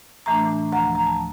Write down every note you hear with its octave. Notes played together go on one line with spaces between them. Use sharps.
A2 E3 A3 D4 A#5
D2 C3 F3 A#5
A#5
A5